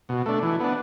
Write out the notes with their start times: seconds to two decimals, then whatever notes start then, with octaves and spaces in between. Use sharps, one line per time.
0.09 B2
0.26 A3 D4
0.43 E3
0.60 B3 D4